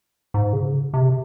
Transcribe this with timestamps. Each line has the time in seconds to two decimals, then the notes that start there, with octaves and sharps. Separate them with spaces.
0.34 G#2
0.53 C#3
0.94 C3